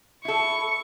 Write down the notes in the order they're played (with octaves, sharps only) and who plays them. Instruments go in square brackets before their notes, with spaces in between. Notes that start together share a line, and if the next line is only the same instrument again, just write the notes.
[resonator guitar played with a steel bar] E4 A4 [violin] C#6